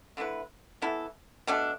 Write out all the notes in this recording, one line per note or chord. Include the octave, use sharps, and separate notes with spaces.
D3 A3 E4 B4
E3 B3 E4 A4
B2 A3 D4